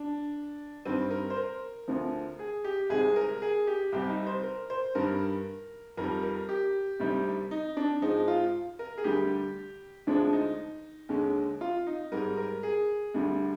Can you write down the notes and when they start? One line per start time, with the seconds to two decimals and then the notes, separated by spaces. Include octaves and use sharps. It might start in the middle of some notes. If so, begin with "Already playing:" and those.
Already playing: D4
0.85 G2 D#3 G3 C4
1.10 A#4
1.30 C5
1.36 A#4
1.88 D2 D3 F3
2.39 G#4
2.64 G4
2.90 C2 C3 D#3 G#3 G#4
3.16 A#4
3.42 G#4
3.67 G4
3.92 C2 C3 G3 G4
4.09 D#4
4.27 C5
4.43 A#4
4.70 C5
4.95 G2 D#3 G3 A#4
5.97 F2 D#3 G3 A#4
6.23 A#4
6.49 G4
7.00 D2 C3 D#3 G3
7.51 D#4
7.77 D4
8.02 G#2 F3 G#3 D#4
8.28 F4
8.79 A#4
8.98 G#4
9.04 D2 D3 G3 G4
10.07 D2 D3 F3 G#3 D4
10.33 D#4
11.09 D#2 D3 G#3
11.61 F4
11.87 D#4
12.12 G#2 G3 A#4
12.37 A#4
12.63 G#4
13.14 D2 D3 G3